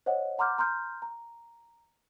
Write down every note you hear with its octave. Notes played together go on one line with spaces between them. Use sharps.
C5 C#5 D#5 F#5
F#5 A#5 C6 D6 F6 G6
A#5 C6 F6 G6
A#5